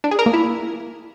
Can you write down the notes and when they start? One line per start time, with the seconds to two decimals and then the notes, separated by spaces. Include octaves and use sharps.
0.04 D4
0.11 G#4
0.19 A#4
0.26 A#3
0.33 E4